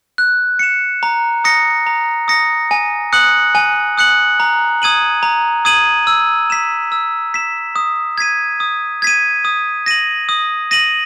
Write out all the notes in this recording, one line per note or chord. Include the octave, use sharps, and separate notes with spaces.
F#6
C#7 E7
A#5
D#6 A#6 C#7
A#5
D#6 A#6 C#7
G#5
D#6 F#6 C#7 F#7
G#5
D#6 F#6 C#7 F#7
A#5
D#6 G#6 D#7 F#7
A#5
D#6 G#6 D#7 F#7
E6
B6 E7
E6
B6 E7
D#6
G#6 B6 D#7
D#6
G#6 B6 D#7
D#6
A#6 D#7 F#7
D#6
A#6 D#7 F#7